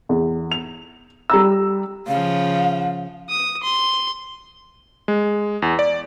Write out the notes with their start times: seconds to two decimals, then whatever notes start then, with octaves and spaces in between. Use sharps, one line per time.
0.09 E2
0.51 F7
1.30 G3 A#5 E6
2.08 C#3 F3 F5
3.30 D#6
3.63 C6
5.08 G#3
5.62 E2
5.79 D5